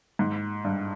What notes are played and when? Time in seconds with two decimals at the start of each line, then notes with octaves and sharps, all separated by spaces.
0.19 G#2
0.65 G2